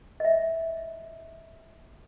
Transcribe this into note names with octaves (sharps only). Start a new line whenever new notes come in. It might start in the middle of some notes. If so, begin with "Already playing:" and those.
D#5 E5